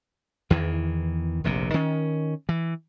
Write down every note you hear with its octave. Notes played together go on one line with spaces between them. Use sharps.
E2 D#3 E3
F1 A#1 C3
D#3 C#4
E3